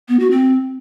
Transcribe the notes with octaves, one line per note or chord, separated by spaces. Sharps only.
B3
F#4
C4